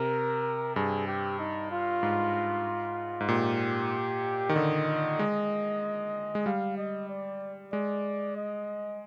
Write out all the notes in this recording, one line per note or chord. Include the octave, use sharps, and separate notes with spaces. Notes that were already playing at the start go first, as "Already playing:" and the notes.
Already playing: C3 A#4
G2 G#4
G4
D#4
F4
G#2
G#2
A#2 G4
D#3
D3 D#5
G#3
G#3
G3 F5
D#5
D5
G#3 D5
D#5